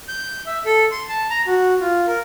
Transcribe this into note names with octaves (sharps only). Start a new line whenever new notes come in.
G6
E5
A4
C6
A5
A#5
F#4
F4
A#4